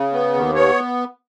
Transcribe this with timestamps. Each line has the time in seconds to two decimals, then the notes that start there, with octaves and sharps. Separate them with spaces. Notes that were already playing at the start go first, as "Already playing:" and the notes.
Already playing: C#3
0.13 B3
0.33 D#2
0.55 B3 C#5